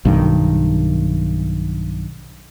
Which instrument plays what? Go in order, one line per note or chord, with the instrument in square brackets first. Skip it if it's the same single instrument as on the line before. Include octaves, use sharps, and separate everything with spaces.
[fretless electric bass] B1 G2 D#3